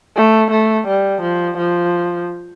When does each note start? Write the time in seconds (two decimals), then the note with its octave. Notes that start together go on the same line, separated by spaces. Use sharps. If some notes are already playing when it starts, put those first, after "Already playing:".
0.17 A3
0.51 A3
0.88 G3
1.22 F3
1.58 F3